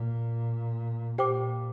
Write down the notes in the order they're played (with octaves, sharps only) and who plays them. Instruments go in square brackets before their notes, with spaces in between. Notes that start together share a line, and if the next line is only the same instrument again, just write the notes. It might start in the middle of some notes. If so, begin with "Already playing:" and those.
Already playing: [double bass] A#2
[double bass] A#2 [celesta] G4 C5 G5 D6